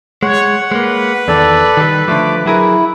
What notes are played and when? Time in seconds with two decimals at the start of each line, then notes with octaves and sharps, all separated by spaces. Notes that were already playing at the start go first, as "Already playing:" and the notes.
0.23 G#3 C#5 F#5
0.71 G#3 A#3 B4
1.28 E2 D#3 A4 D5
1.77 D#3 G3
2.08 D3 F3 A3 D6
2.46 F#3 E4 G#4 A#4